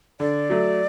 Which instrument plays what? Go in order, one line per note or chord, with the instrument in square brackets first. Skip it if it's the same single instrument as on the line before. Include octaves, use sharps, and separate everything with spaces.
[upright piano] D3 [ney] D5
[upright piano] F#3 A3